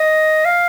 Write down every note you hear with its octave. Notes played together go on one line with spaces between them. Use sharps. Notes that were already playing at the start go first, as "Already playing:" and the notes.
Already playing: D#5
F5